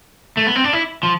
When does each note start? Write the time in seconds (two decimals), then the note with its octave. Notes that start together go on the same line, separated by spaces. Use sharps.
0.37 A3
0.47 B3
0.55 C4
0.64 D4
0.73 E4
1.03 F3